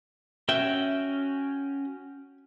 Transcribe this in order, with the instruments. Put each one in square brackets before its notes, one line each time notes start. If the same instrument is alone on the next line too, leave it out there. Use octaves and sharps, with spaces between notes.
[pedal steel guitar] C#4 F#4 G5 [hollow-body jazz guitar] E5